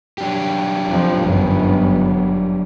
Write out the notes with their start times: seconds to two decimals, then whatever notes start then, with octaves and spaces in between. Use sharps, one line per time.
0.18 F#3 D4 G4
0.88 F2 F3
1.21 G1 F#2 B3